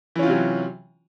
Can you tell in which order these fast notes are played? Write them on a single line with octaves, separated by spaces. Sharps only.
E3 C#4 F4 C3 F#3